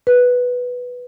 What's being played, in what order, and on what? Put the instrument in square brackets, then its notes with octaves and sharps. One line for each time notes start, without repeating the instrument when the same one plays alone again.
[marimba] B4